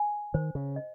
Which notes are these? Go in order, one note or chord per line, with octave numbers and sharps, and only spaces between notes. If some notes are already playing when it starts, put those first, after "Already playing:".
Already playing: G#5
D#3 C5
C#3
D#5